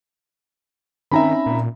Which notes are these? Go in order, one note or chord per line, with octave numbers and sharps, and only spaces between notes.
D#3 C4 C#4 D#4 E5 A#5 B5
A#2